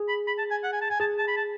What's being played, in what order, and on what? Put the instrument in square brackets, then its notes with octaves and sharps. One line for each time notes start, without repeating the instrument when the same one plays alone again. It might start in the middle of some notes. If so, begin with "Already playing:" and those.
Already playing: [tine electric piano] G#4
[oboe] B5
B5
A5
G#5
F#5
G#5
A5
G#5
[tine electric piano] G#4 [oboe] A5
[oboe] A5
B5
A5